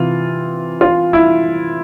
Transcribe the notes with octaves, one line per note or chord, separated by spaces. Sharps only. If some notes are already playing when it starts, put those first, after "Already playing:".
Already playing: C3 E3 F4
F4
E4